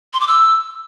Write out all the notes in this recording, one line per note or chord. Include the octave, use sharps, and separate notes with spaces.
C6
D6
E6